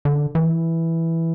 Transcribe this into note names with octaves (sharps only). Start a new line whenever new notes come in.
D3
E3